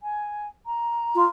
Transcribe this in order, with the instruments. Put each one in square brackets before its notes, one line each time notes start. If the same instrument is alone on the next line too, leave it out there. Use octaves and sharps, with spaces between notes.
[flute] G#5
A#5
[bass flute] F4